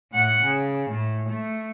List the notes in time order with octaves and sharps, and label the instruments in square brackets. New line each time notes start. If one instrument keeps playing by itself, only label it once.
[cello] A2 F#5
C#3
A2
A3